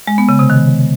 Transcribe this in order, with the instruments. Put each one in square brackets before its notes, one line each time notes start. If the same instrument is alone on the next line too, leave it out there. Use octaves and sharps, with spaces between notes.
[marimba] G#3
B3
C#3
C3
D#3